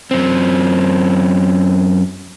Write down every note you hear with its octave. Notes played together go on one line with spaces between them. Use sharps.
F#2 C4